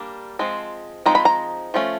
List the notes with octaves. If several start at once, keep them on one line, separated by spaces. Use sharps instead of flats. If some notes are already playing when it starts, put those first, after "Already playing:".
Already playing: G3 A#3 D4
F3 G#3 C4
F3 G#3 C4 D#4 A#5
B5
A#5
F3 A3 C#4